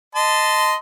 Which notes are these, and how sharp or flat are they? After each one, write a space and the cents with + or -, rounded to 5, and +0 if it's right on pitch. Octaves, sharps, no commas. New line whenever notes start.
D#5 +0 A5 +0 C6 -20